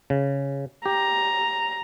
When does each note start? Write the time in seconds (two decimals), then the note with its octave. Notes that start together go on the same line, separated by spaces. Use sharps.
0.10 C#3
0.86 G4 A#5